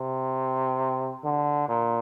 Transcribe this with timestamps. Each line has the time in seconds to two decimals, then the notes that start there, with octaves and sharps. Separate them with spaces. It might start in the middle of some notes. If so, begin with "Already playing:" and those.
Already playing: C3
1.24 D3
1.68 A#2